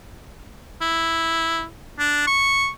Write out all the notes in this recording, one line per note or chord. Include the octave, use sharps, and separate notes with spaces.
E4
D4
C#6